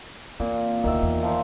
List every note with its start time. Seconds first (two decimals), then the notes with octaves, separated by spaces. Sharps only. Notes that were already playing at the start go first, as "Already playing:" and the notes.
0.40 E2 A#2 C4
0.84 E1 D2 D#3 E5
1.03 E2
1.23 D#3 F3